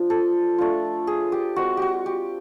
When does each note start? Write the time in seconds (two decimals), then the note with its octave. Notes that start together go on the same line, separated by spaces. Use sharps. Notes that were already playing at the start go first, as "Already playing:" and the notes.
Already playing: F3 D4 F4
0.10 A4
0.58 A3 D4 F4
1.07 G#4
1.32 G4
1.56 G#3 C4 F4 F#4
1.77 F#4 G4
2.06 G4